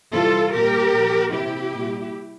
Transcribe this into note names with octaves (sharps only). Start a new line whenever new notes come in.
C3 E3 G3 F4 A4
A#2 G3 G4 A#4
A#2 F3
C3 E3 G3 E4 G4
A#2 G3